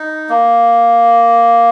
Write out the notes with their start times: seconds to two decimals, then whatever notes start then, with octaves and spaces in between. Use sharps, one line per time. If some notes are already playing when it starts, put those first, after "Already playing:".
Already playing: D#4
0.29 A#3